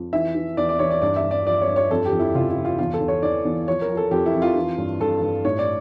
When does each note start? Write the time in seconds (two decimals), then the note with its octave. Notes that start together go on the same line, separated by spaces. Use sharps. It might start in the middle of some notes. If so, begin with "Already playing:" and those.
Already playing: F2
0.13 E3 E5
0.35 E3
0.57 E2 D5
0.69 D5
0.79 E3 C#5
0.90 D5
1.02 G2 D5
1.16 E5
1.23 G2
1.31 D5
1.45 F3 D5
1.61 C#5
1.68 G2
1.76 C#5
1.90 F2 A4
2.05 G4
2.12 F2
2.19 E4
2.35 C#3 F4
2.50 E4
2.57 F3
2.65 F4
2.78 E2 F4
2.94 A4
3.01 E2
3.08 C#5
3.23 E3 D5
3.45 E2
3.67 F3 C#5
3.82 A#4
3.90 F3
3.97 A4
4.11 F2 G4
4.26 E4
4.35 F2
4.42 F4
4.56 E3
4.78 G2
5.00 G2 A4
5.22 G2
5.45 A2 C#5
5.59 D5